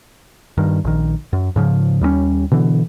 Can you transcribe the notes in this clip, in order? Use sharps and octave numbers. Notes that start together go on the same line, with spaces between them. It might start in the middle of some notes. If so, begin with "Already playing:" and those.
G2 D#3
A#1 D#3
F#2
G#2 C#3 F3
D#2 G3 G#3 C#4
B2 D3 E3